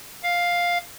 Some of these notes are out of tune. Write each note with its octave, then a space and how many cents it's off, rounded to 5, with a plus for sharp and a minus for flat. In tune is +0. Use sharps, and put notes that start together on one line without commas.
F5 +5